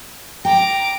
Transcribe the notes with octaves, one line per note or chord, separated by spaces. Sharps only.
G5 A#5 D6